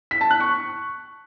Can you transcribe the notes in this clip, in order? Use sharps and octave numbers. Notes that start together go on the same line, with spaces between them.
B6
A5
F#6
C#6